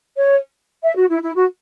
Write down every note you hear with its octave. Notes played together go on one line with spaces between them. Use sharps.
C#5
E5
F#4
E4
E4
F#4